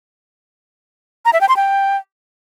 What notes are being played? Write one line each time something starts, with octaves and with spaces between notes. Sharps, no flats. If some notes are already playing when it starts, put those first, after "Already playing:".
A#5
E5
G5
C6
G5